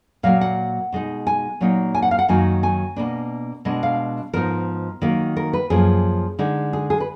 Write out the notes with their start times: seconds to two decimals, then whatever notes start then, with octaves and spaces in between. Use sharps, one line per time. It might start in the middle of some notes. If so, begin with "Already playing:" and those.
0.23 A#2 F#3 A#3 F5
0.41 F#5
0.93 B2 G#3 D#4
1.27 G#5
1.61 A#2 F#3 A#3 D#4
1.95 G#5
2.02 F#5
2.11 F5
2.19 F#5
2.28 F#2 D#3 F#3 A#3 D#4 G#5
2.63 G#5
2.96 B2 A#3 D4
3.65 B2 G#3 D4
3.83 F5
4.34 G#2 F3 B3 D#4 A#4
5.02 D#3 F#3 A#3
5.37 A#4
5.53 B4
5.70 F#2 F3 A#3 G#4
6.39 D3 G#3 D#4
6.73 G#4
6.90 G#4
7.00 B4